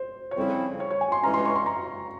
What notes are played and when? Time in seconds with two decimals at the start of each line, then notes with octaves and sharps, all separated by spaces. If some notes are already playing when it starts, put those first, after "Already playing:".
Already playing: C5
0.31 C#5
0.36 F2 C#3 G3 C4 E4 C5
0.80 C#5
0.91 C#5
1.01 G#5
1.12 C6
1.23 G2 E3 G#3 C#4 A#5
1.34 C6
1.45 C#6
1.55 C6
1.66 A#5